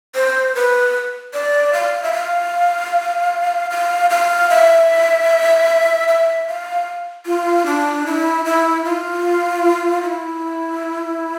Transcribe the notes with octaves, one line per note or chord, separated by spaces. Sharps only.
C5
B4
D5
F5
E5
F5
F5
F5
E5
E5
F5
F4
D4
E4
E4
F4
E4